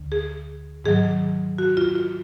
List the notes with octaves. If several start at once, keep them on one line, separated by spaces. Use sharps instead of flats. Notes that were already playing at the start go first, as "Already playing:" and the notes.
Already playing: D2 D3
G#4
G#2 D#3 F#3 G#4
F#4
F4
F4